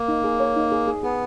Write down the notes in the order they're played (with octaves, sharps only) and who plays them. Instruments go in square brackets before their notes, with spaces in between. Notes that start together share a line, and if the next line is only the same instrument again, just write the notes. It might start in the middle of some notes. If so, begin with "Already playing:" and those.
Already playing: [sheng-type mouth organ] A#3
[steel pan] D#4
G#4
C#5
D#4
G#4
G#4
[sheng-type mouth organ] B3 [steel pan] G#4